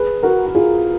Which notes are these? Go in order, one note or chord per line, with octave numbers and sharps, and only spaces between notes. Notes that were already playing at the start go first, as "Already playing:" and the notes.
Already playing: G#4 B4
F#4 A#4
F#4
F4 G#4